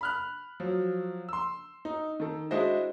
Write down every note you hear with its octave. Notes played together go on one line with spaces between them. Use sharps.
B5 F6 F#6
F3 F#3
C6 E6
D#4
D#3 A4
G#3 D4 E4 F#4 C5 D#5